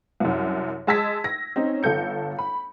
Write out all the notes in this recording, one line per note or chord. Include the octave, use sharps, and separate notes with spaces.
C2 F#2
G#3 D#5 A5 E6 G#6 B6
A#6
C4 C#4 D#4
G1 A4 G6 C#7
B5